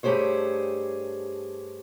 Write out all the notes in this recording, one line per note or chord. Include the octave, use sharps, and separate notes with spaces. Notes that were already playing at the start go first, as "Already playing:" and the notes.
G2 A3 G4 G#4 C5 C#5